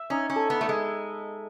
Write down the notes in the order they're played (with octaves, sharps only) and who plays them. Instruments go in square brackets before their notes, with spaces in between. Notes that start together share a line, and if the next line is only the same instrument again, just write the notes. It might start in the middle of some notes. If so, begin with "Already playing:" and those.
Already playing: [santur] E5
[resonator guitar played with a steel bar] C#4 [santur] D#4
[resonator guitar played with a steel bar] C#4
[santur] A4
[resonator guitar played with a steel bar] B3
[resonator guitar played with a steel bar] A3 [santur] E5
[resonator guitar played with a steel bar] G#3